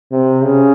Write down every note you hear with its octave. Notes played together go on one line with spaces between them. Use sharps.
C3
C#3